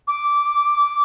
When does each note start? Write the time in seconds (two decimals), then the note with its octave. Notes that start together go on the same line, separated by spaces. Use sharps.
0.08 D6